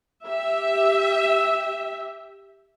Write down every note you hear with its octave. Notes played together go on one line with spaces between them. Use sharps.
G4 E5